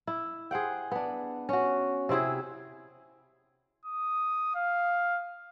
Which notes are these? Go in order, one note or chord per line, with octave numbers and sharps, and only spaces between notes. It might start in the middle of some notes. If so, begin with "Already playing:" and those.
E4
G#4 C5 F#5 G5
B3 D4
C#4 F#4
C3 C4 E4 G#4
D#6
F5